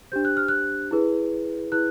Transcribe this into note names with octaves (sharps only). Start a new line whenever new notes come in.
D4 G4 C5 G6
F#6
F6
F#6
E4 G#4 B4
E4 G#4 B4 F#6